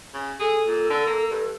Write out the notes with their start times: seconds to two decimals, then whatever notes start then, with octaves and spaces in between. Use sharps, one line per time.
0.14 C#3
0.40 G#4 A4
0.67 A#2
0.90 D3
1.07 A#3
1.31 G2